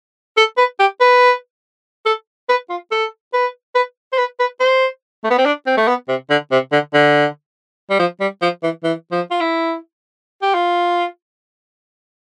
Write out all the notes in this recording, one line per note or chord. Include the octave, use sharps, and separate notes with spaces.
A4
B4
G4
B4
A4
B4
F4
A4
B4
B4
C5
B4
B4
C5
A3
B3
C4
D4
C4
A3
B3
C3
D3
C3
D3
D3
G3
F3
G3
F3
E3
E3
F3
F4
E4
G4
F4